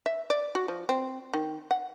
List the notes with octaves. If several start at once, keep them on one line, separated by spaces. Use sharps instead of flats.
E5
D5
F#4
F3
C4
D#3
F#5